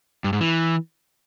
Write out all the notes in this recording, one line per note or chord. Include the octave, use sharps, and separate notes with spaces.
G2
G#2
E3